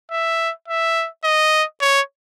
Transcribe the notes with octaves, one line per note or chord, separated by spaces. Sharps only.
E5
E5
D#5
C#5